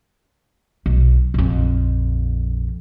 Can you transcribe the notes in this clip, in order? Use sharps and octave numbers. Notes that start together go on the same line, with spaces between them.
B1
A#1 F2